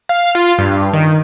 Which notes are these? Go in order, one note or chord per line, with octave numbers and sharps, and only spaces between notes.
F5
F4
G2
D#3